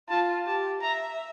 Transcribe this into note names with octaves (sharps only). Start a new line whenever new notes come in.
F4 A5
G4 A5
E5 A#5